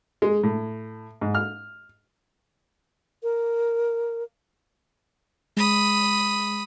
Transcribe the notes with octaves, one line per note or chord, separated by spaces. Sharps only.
G#3
A2
G#2
F6
A#4
G#3 B5 D#6